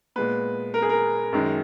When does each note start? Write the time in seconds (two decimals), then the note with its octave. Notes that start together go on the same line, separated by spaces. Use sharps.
0.16 A#2 G#3 B3 B4
0.74 A#4
0.82 G#4
0.90 A#4
1.33 F#2 D#3 G#3